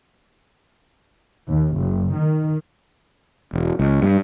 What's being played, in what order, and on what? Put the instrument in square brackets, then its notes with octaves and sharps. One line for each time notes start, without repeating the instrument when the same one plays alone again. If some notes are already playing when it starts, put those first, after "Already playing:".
[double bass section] D#2
F#1
D#3
[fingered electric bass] E1
C#2
G2